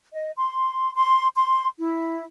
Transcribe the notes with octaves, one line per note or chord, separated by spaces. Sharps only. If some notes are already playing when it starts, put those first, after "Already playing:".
D#5
C6
C6
C6
E4